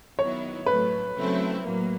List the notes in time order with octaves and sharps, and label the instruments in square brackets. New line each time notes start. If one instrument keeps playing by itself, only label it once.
[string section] D#3 F#3 B3 E4 [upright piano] C#5
[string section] A2 F#3 A3 [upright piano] B4
[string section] C#3 F#3 A3 C4 E4
A2 F#3 A#3